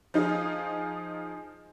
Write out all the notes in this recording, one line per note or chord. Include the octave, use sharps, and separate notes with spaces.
F3 D#4 F4 G#4